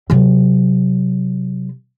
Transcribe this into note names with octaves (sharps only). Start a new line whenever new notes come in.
C3 F#3